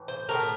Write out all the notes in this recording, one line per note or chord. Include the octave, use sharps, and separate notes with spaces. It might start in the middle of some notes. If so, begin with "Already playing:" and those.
Already playing: A2 E3
C5
A2 E3 A3 A#4